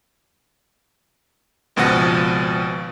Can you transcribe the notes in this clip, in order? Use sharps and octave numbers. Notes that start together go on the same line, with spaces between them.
G#1 C#2 B2 F3 F#5 A#6